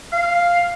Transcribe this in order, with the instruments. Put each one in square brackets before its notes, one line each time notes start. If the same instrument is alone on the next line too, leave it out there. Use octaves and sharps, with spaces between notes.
[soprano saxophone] F5